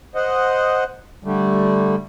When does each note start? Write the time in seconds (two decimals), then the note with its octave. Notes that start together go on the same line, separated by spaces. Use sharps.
0.15 C5 D#5 F#5
1.24 D3 G3 A3